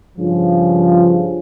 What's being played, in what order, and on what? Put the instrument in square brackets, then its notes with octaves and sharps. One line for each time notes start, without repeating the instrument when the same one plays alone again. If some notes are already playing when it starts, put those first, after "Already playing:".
[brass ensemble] G2 C#3 F3